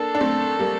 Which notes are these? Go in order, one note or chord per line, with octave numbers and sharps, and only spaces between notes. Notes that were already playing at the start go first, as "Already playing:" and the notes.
Already playing: A#3 D4 A4
D4
A3 C4
G3 A#3